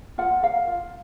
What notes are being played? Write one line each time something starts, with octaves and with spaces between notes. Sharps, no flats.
F4 F#5
A#4 F5
F4